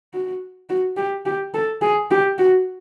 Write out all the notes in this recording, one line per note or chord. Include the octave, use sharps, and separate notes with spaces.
F#4
F#4
G4
G4
A4
G#4
G4
F#4